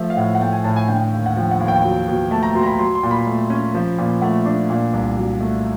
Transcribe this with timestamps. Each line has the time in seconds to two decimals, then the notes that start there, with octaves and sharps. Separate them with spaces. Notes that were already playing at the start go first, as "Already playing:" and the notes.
Already playing: F3 A3 E5
0.10 F5
0.17 A2 F#5
0.35 F#5
0.41 A3 G5
0.53 G#5
0.64 A2 A5
0.76 G#5
0.88 D3 G5
1.12 D#2
1.26 F#5
1.36 F3 G5
1.51 F#5
1.60 D#2
1.68 G5
1.84 F#3
2.08 B2
2.31 A3 A5
2.43 A#5
2.55 B2 C6
2.63 A#5
2.66 B5
2.79 F#3 C6
2.95 C6
3.03 A#2
3.11 B5
3.27 A3
3.50 C#4
3.74 F3
3.98 A#2
4.21 A3 F#5
4.45 D4
4.70 A#2
4.93 C2
5.17 F#3
5.41 A3